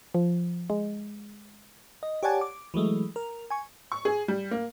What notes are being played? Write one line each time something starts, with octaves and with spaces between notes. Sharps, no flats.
F3
G#3
D#5
G4 C#5 D5 F#5 G#5 A5
D6
E3 F#3 G#3 A3
A#4
G#5 C#6
C#6
G#4
G3
A#3